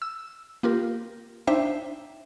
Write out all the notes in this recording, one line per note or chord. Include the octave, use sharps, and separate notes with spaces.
E6
A#3 F4 G4 A#4
D4 D#4 C5 E5 G5